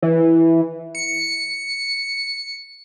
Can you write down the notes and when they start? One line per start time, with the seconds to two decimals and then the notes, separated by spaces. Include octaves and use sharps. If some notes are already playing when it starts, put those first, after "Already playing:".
0.02 E3
0.95 C#7